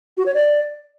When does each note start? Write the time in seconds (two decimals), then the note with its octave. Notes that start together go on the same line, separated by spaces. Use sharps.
0.17 F#4
0.26 C#5
0.34 D5